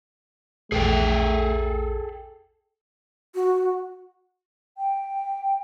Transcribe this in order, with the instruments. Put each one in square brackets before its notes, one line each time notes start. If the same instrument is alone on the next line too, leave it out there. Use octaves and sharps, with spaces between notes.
[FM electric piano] A#1 E2 [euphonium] A3 [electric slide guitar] G#4 A4 G5
[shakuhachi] F#4
[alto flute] G5